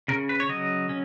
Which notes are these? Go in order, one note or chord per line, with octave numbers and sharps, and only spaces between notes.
C#3 A#4
B4
C#5
F#3 D#5
C#4